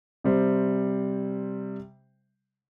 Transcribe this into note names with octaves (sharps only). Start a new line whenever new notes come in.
C3 G3 C5